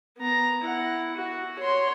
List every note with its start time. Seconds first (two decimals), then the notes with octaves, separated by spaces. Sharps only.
0.17 B3 A#5
0.61 E4 F#5
1.17 F#4
1.59 C#5 C6